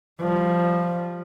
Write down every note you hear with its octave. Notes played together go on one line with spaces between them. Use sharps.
F3 G3